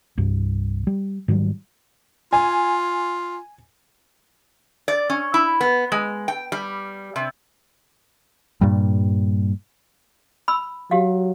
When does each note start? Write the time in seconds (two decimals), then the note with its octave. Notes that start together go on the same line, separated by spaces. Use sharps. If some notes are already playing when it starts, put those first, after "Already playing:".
0.17 C2 G2
0.87 G3
1.28 G#2 D#3 F#3 G3
2.33 F4 G#5
4.88 D5
5.10 C#4
5.34 E4
5.61 B3
5.92 G#3
6.28 G5
6.52 G3
7.16 C3
8.61 G2 A#2 G3
10.48 B5 E6
10.91 F#3 G4 F5